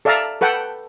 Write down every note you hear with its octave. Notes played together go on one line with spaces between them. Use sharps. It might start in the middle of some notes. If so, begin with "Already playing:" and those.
A4 D5 E5 F5 A5 A#5
A4 B4 F#5 G5 A5